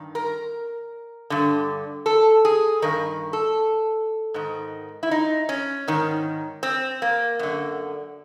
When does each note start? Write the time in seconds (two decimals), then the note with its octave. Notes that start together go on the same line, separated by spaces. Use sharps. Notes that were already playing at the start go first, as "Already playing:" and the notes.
Already playing: G2 D#3
0.15 A#4
1.30 G2 D3
2.06 A4
2.45 G#4
2.82 G2 D#3 A#4
3.33 A4
4.34 G#2 D#3
5.03 E4
5.11 D#4
5.49 C#4
5.88 G#2 D#3
6.63 C4
7.02 A#3
7.39 F#2 D3